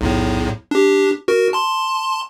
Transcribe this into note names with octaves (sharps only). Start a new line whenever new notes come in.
B1 E2 A2
D4 G4
F#4 A#4
A5 C6